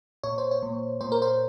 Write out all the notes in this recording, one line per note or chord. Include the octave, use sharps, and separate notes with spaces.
A#2 C#5
C5
C#5
A#2
A#2 C5
A#4
C5